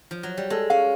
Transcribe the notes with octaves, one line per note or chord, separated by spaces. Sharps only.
F3
F#3
G3
G#3 A4
C#4 F5